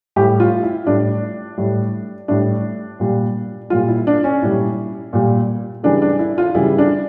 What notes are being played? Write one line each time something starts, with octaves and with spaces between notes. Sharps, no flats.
A2 G3 G4
F4
E4
A2 G3 D4
A2 G3
A2 G3 D4
A#2 G3
A#2 G3 F4
E4
D4
C#4
A#2 G3 E4
A#2 G3
C#3 E3 G3 D4
D4
E4
F4
C#3 E3 G3 E4
D4